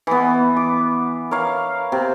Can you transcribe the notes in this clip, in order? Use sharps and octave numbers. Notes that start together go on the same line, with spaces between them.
E3 B3
D6
A#4 C#5 F5
C3